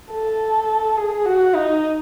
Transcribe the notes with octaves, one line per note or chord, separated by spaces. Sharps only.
A4
G#4
F#4
D#4